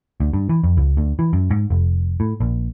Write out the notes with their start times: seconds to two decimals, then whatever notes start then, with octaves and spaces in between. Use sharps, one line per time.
0.20 D2
0.33 G2
0.49 E3
0.63 F2
0.77 C#2
0.97 D2
1.19 E3
1.33 F#2
1.51 G#2
1.70 F1
2.20 A2
2.40 A#1